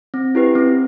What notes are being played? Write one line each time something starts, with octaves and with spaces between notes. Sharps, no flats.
C4
E4 G4 B4
C4